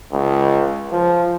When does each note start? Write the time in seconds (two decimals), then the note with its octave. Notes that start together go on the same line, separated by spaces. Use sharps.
0.13 C#2
0.92 F3